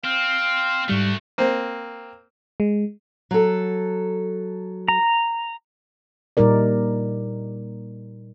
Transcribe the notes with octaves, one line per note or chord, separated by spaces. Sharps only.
C4 F5
G#2 G3 A3 F#4
A#3 C4
G#3
F#3 A4
A#5
A#2 G3 D#4 A#4 D5